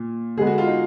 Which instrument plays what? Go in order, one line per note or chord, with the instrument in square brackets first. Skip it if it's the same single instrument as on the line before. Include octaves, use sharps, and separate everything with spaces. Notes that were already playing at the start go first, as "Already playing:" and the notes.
Already playing: [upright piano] A#2
[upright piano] D3 G#3 B3 [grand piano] G#4
[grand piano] F#4
F4
D#4